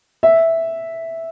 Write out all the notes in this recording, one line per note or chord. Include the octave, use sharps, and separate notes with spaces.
E5